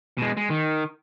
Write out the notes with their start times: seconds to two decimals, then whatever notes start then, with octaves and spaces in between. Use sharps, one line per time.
0.18 B2 G#3
0.37 G#3
0.50 D#3